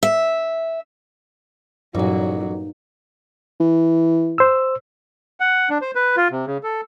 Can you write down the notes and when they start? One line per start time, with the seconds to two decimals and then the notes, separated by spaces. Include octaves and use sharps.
0.03 E5
1.95 A1 G2 A#2 F#3 D#4
3.61 E3
4.38 C5 E6
5.40 F#5
5.70 D4
5.81 C5
5.95 B4
6.17 F4
6.31 C3
6.47 C#3
6.63 A4